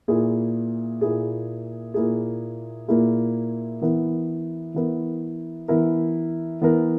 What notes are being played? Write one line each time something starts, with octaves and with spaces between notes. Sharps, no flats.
A#2 A#3 E4 G#4
A#2 A#3 E4 G#4
A#2 A#3 E4 G#4
A#2 A#3 E4 G#4
E3 B3 E4 A#4
E3 B3 E4 A#4
E3 B3 E4 A#4
E3 B3 E4 A#4